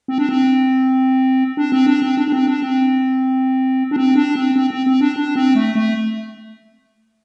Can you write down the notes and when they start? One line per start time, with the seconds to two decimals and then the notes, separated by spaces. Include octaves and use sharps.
0.08 C4
0.18 D4
0.29 C4
1.57 D4
1.72 C4
1.87 D4
2.02 C4
2.17 D4
2.28 D4
2.32 C4
2.47 D4
2.62 C4
3.91 D4
3.96 C4
4.16 D4
4.36 C4
4.56 C4
4.70 C4
4.87 C4
5.01 D4
5.16 D4
5.36 C4
5.55 A3
5.75 A3